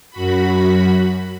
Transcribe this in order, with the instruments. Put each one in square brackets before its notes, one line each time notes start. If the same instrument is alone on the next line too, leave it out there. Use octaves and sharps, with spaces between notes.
[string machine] F#2 F#4 B5